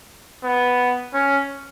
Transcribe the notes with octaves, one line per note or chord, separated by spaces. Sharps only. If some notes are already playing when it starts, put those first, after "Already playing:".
B3
C#4